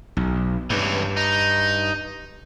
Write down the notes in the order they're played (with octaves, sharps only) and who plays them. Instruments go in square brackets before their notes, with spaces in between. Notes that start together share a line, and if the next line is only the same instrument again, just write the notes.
[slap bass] B1
[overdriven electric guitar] C#2 E3 [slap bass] G2
[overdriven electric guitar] D#4